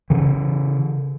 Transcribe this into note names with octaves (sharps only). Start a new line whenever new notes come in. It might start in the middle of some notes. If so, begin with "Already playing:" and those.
C#3 E3